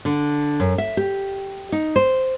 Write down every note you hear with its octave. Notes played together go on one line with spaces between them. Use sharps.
D3
F#2
E5
G4
D#4
C5